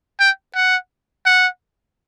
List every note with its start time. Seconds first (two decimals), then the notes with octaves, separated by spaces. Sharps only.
0.20 G5
0.55 F#5
1.26 F#5